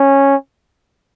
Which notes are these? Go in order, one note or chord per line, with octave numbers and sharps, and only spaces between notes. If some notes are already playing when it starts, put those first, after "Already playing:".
Already playing: C#4